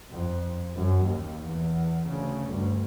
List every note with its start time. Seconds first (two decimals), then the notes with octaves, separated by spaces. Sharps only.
0.10 F2
0.75 F#2
1.03 D#2
1.46 E2
2.06 D2 C#3
2.46 D2 G2